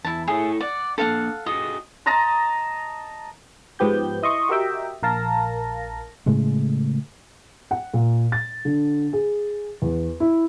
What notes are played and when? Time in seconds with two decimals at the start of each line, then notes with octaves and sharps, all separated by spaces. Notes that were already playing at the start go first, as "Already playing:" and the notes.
0.05 E2 E4 A5
0.28 A3 E4 G#4 C#5
0.61 D5 F#5
0.98 A#3 D4 A4 F5 F#5
1.46 F4 F#4 G#4 D#5
2.06 D#5 A5 A#5 C6
3.79 G#2 F3 B3 G4 G6
4.23 E4 D#5 C6 C#6
4.49 F#4 G4 A#4 D#5 E5 G5
5.03 A#1 A#4 F5 A5 A#6
6.26 A2 C#3 G#3 A3
7.71 F#5
7.94 A#2
8.32 A6
8.65 D3
9.13 G#4
9.82 E2
10.20 E4